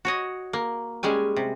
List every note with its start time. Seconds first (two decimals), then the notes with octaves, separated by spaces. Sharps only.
0.05 F#4 C#5 D#5
0.53 A#3
1.03 G3 G#3 C#4 G#5
1.36 C3